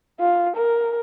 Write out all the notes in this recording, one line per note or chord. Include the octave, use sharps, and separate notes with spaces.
F4
A#4